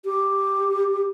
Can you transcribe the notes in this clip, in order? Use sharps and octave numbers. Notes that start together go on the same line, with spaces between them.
G4